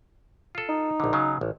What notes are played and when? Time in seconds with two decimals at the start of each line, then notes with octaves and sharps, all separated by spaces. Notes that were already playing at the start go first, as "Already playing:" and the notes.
0.55 F4 A4
0.69 D#4
1.00 A#1 D3
1.13 C#3 F#3
1.41 A1